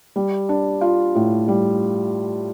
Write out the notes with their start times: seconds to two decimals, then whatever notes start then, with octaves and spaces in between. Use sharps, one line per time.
0.16 G3
0.49 D4
0.81 F4
1.15 A2
1.48 G3